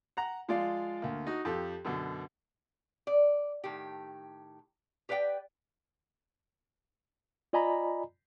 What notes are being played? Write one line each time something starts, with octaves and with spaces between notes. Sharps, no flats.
F#5 A#5
F3 G#3 F4 D5 F5
D2 A#3
D#4 F#4
F2 G4 A4
F#2 B2 D3
D5
A2 D#3 G4
G4 B4 D5 F5 G5
F4 D5 D#5 G#5 A#5 B5